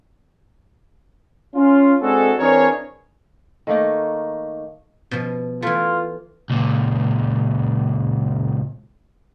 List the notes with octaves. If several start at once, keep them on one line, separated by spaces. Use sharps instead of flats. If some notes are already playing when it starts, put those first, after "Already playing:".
C#4 F4
G#3 C4 D4 F#4 G#4 A4
E3 C4 D4 G#4 A#4 C#5
D#3 A3 A#3 D#4
B2 F3
E3 A3 F4
C#2 A#2